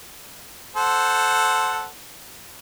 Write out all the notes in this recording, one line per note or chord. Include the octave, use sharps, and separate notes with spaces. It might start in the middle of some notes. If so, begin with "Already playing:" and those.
A4 C5 F#5